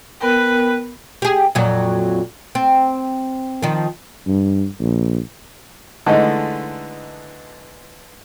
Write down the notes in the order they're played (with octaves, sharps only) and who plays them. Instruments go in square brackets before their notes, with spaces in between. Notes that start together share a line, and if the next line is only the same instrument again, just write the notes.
[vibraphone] B3 A#4 G5 [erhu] B4
[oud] G4 G#4
F2 A#2 F#3
C4
D#3 F3
[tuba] G2
A#1
[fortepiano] D3 E3 G#3 A3 D#4